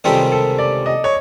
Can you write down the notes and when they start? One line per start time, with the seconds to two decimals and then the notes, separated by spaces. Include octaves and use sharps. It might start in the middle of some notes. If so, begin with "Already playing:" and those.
0.04 C#2 C3 D#3 G3 C4 A4
0.32 A4
0.58 D5
0.86 D#5
1.04 C#5